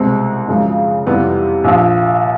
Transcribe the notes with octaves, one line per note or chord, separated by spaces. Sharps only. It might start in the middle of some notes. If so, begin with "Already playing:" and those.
Already playing: C2 B2 G#3 C4
F#2 C#3 F3 G#3
F2 C3 E3 G3 B3
A#1 A#2 F3